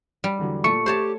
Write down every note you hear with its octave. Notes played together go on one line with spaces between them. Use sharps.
G3
E2 D3 F#3
A#2 A3 C#6 C#7
A3 G4 C5 C#5 A5